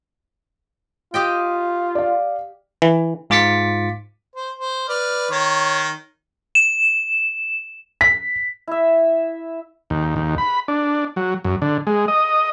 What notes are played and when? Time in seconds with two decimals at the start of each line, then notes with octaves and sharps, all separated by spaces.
1.14 F4 G4 D#5 G5
1.95 D5 F5
2.82 E3
3.30 G#2 F4 D6 A6 B6 C#7
4.36 C5
4.59 C5
4.89 B4 D5 F6
5.31 D#3 C#5
6.55 E7
8.01 B6
8.67 E4 E5
9.90 D#2
10.16 D#2
10.38 B5
10.68 D4
11.16 F#3
11.44 F#2
11.62 D3
11.87 G#3
12.08 D#5